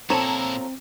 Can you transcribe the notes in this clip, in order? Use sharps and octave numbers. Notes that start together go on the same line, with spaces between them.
A#2 F3 C4 E4 A4 C#5 A#5 E7